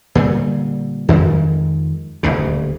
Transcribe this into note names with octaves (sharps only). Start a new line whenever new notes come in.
A#2 D3 G3
F2 D#3 F3 G#3
D#1 G#1 D2 C#3